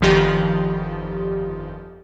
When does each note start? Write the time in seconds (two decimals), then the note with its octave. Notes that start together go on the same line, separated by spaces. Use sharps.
0.01 G1 F2 D#3 F3 G4